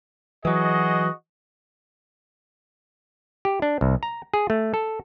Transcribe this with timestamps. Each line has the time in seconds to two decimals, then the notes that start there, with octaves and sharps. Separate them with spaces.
0.45 E3 F#3 F#4 G#4 D#5
3.45 G4
3.62 D4
3.81 C2
4.03 A#5
4.34 G#4
4.50 A3
4.74 A4